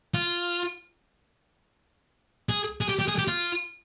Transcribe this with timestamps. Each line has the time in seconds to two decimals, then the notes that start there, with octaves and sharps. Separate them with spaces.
0.14 F4
2.49 G#4
2.81 G#4
2.89 G4
2.99 G4
3.08 G#4
3.19 G4
3.28 F4